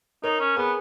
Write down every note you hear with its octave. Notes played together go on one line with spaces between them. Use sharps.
D#4 A#4 C#5
C#4
B3 G#4 B4